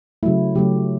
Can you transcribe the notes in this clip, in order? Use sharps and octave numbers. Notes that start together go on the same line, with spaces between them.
C#3 F#3 A3 E4
C#3 F#3 A3 G4